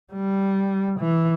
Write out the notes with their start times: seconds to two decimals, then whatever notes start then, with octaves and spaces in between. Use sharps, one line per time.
0.13 G3
0.99 E3